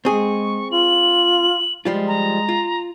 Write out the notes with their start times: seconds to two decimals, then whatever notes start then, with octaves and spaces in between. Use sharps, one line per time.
0.05 G#3 C4 G#4 C#6
0.72 F4 F#7
1.85 F3 G3 G#3 F4
2.08 A#5
2.49 F4